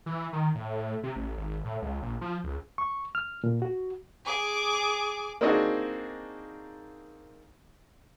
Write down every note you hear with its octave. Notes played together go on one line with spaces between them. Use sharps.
E3
D#3
A2
C3
A1
G#1
A2
C#2
A#1
F3
C#2
C#6
F6
A#2
F#4
G#4 D6
A#3 C4 D4 D#4 F#4 G#4